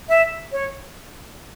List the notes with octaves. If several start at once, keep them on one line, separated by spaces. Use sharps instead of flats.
E5
C#5